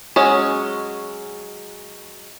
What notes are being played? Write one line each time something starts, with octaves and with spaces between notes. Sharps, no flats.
F#3 G#3 C#4